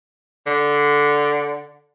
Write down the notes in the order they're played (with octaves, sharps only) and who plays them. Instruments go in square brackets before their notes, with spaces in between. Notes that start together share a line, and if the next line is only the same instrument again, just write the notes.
[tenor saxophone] D3